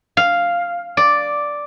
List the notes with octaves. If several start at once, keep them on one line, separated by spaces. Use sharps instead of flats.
F5
D5